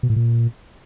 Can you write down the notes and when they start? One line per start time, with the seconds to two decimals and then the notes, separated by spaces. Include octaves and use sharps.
0.03 B2
0.10 A2
0.16 A#2